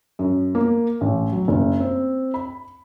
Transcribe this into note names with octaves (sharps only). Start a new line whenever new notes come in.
F#2
A#3
A1
F#3
F#1
C4
B5